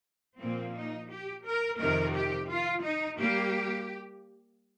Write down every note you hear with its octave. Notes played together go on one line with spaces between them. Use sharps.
A#2 F3 A#3 C4
D#4
G4
A#4
F2 C3 D#3 A#4
G4
F4
D#4
G3 A#3 G4